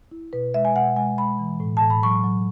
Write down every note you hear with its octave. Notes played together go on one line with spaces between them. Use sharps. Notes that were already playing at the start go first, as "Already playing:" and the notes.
E4
B2 B4
G#3 E5
G#5
B2 F#5
G#3 G#5
G#3 B5
E3
A2
A2 A5
B5
F#3 C#6
F#3